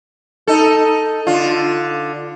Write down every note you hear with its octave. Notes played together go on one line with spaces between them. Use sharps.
D#4 A4
D3 F4